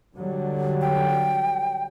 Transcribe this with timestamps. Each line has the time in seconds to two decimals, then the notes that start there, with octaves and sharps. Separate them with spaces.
0.15 D3 F#3 G3
0.81 G5